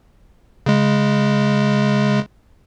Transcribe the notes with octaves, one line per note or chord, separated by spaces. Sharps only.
C#3 G#3